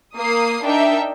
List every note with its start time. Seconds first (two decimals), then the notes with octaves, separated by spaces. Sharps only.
0.16 A#3 D#6 C7
0.63 D4 D#4 A#4 E5 G5